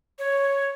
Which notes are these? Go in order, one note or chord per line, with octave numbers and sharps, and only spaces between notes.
C#5